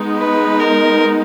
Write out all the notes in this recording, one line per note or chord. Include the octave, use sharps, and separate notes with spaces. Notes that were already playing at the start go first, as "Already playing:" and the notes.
Already playing: G#3 B3 D#4
B4
A#4